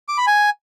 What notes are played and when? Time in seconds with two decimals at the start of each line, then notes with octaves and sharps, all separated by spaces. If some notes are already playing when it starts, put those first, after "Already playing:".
0.08 D6
0.18 B5
0.27 G#5